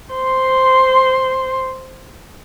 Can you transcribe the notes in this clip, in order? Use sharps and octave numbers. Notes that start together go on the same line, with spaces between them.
C5 C6